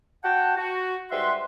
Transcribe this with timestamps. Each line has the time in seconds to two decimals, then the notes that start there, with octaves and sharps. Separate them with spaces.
0.24 F#4 F#5 G5 A5
0.57 F#4
1.11 G#2 G3 B4 E5 F#5 C6